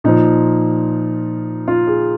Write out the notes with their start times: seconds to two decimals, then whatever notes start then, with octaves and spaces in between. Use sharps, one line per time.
0.04 A#2 F3 D#4
1.68 F4
1.87 G#4